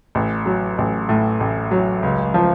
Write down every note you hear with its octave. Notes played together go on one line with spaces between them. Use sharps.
A1
F#3
A1
A2
A1
F#3
C#2
F3